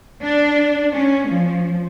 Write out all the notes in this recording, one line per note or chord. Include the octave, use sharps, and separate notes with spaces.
D4
C#4
F3